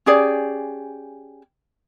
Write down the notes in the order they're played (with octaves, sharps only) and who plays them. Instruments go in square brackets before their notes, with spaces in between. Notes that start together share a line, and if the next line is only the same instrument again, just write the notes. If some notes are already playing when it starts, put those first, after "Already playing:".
[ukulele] C#4 G4 G#4 D5